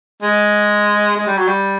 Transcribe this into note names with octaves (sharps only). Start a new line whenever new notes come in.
G#3
G#3
G3
F#3
G3